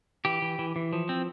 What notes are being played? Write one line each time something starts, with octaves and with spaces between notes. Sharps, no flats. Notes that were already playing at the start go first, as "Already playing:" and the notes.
E3 G4
E3
E3
E3
F3
C4